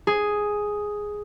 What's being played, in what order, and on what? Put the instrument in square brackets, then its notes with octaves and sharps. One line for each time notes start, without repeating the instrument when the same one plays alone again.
[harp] G#4